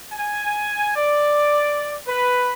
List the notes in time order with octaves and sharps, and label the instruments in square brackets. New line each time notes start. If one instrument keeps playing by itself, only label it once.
[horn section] G#5
D5
B4